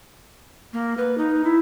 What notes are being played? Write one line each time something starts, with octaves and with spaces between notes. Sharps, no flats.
A#3
B4
D#4
E4